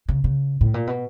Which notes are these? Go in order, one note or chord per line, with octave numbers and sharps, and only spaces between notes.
C#3
C#3
A2
A#2
B2